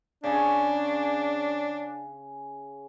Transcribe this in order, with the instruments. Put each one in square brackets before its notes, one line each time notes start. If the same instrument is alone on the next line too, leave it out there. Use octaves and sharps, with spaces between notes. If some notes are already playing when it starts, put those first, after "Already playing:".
[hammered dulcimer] C#3 G#4 [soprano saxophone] D4